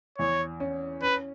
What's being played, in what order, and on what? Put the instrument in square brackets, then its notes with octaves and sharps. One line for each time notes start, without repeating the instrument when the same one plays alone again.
[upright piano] E2 [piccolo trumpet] C#5
[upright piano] C#4
[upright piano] C#4 [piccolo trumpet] B4